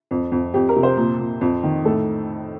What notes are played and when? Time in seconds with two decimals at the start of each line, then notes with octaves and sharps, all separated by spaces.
0.11 F2
0.32 F2
0.54 F2 G4
0.69 A#4
0.76 C3
0.83 C5
0.97 A#2
1.20 A#2
1.41 F2
1.64 D#3
1.85 A2 A4